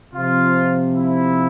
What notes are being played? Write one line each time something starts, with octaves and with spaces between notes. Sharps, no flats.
C3 F3 F4
E4